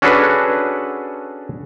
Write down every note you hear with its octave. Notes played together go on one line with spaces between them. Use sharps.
C#4 D4 F#4 G#4 A4 B4